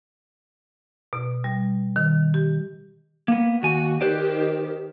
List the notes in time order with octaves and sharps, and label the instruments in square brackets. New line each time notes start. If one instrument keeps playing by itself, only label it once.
[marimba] B2
G3
D#3
G4
[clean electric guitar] A#3 B3
[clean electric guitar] D#2 G#5 [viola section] F#4
[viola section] D#3 G4 [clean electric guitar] B4 C5 D5